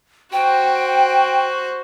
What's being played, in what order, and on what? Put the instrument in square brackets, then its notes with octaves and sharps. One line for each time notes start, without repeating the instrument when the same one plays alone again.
[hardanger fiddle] F#4 C5 [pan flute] G5